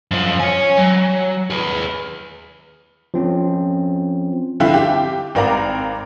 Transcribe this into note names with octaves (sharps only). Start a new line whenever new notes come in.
F#2 F3
C#5 G#5
F#3
G#4 B4
F3 C4 C#4
D3 F3 C4 E4 F4
G4
G#1 C4 A#4 D5 F5 A#5